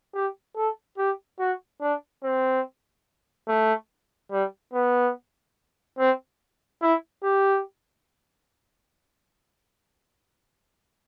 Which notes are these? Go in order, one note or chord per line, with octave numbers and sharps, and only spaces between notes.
G4
A4
G4
F#4
D4
C4
A3
G3
B3
C4
E4
G4